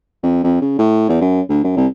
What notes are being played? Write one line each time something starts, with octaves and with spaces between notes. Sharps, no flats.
F2
F2
C#3
A2
E2
F#2
D2
F#2
C2